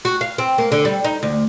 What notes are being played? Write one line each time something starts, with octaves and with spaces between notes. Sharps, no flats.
F#4
F5
C4
A#3
D3
G3
D#4
D2